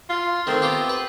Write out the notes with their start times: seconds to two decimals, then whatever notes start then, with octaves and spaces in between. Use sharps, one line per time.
0.09 F4
0.47 D#3 A3 C4
0.62 B3 F4 G4
0.89 B4